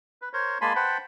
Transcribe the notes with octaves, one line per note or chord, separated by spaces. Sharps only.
B4
A#4 C5 C#5
G#3 A#3 G#5 A5 B5 C6
B4 C5 F#5 G5 A5 B5